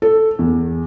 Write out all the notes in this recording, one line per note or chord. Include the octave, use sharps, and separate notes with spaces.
A4
E2